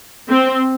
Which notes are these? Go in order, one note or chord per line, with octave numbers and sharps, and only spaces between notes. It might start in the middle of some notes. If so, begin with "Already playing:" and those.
C4